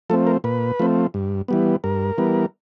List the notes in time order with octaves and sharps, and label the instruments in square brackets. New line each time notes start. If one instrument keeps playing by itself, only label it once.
[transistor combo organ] F3 A3 C4 A4
A#4
A#2 B4
F3 A3 C4
G2
E3 G3 B3
G2 A#4
E3 G3 B3